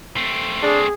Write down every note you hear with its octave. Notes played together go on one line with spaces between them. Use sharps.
A3 C4
D4 G#4